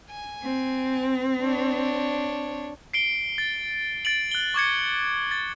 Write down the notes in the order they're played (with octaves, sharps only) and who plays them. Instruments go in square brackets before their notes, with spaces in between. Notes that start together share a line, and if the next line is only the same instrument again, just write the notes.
[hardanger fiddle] G#5
[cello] C4
[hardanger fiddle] D4 C#5
[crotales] C7 D7 G7
A6
A6 D7 F#7
F#6 G7
C#6 D6 G#6 C#7
A6